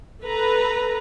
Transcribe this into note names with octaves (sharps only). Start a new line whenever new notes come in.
A4 B4 A#5